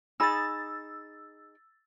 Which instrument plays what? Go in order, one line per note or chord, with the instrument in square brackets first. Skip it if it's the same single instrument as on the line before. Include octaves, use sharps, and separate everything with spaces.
[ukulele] D#4 G#4 B5 [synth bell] E6 A6